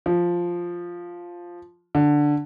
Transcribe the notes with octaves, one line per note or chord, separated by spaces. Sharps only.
F3
D3